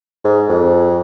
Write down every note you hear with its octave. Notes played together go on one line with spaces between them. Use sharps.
G#2
F2